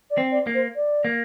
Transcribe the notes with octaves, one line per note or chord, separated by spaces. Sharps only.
D5
C4
D5
A#3
C5
D5
A#3